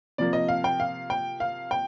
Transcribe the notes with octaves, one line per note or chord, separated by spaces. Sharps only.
C3 F3 A#3 D5
D#5
F5
G5
F5
G5
F5
G5